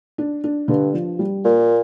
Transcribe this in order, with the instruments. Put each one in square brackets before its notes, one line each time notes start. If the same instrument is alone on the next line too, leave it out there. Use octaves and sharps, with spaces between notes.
[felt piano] D4
D4
[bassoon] G2 [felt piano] D3
[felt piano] F3
G3
[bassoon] A#2 [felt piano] A#3